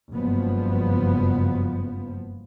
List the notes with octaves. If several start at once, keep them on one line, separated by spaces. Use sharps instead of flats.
F#1 G2 F3 B3